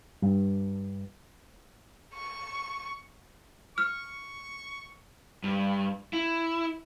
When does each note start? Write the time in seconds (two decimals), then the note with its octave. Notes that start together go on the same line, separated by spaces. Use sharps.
0.22 G2
2.14 C#6
3.78 C#6 F6
5.43 G2
6.13 E4